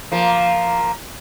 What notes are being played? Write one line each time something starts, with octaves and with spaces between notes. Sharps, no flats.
F3 A#3